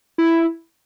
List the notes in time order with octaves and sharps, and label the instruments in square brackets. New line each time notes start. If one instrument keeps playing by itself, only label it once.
[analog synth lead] E4